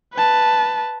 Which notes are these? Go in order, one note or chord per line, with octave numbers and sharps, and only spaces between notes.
B4 A5